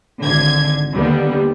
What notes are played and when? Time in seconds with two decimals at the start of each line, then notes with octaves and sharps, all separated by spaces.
0.24 G#1 D3 G#6
0.94 D#2 D3 G3 B3